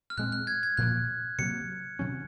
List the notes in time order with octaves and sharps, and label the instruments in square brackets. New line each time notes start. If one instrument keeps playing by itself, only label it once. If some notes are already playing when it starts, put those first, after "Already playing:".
[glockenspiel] F6
[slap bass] A#2 G#3 C4 [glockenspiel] F#6
[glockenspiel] F#6
G#6
G#6
[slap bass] A#2 F3 A#3 [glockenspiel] F#6
[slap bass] C3 F#3 A#3 [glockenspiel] C#7
[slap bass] C3 D#3 F#3 C#4